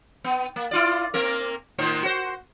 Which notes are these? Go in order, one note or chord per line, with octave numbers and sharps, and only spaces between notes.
B3
A#3
E4 F4 D5
A#3 C4 A#4
A2 D#3 C5
F#4 C5